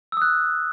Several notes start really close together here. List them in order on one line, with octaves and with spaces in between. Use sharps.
E6 D#6 F#6